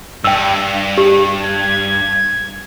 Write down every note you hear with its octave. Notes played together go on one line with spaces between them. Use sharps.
G2 G5 E6
G4
G#6